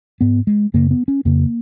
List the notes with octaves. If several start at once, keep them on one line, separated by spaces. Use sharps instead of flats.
G#2 B3
G#3
F#2 C#3 A#3
B3
C#4
F2 C#3 A#3